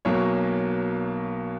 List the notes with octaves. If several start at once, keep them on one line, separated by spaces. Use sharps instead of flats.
B1 B2 F#3 A#3 C#5